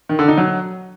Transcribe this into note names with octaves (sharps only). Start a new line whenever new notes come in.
D#3
D3
D#4
F#3